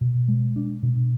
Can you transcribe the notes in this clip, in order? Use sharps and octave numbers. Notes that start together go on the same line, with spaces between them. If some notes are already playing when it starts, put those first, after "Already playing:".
B2
G#3
D4
B2